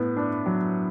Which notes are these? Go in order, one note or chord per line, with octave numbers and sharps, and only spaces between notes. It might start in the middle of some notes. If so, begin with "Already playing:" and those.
Already playing: A2 B3
D4
F#3